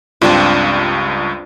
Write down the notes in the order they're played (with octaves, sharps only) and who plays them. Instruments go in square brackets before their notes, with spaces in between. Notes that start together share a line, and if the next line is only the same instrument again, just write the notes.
[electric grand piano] C#2 G2 [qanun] C4 D4 F4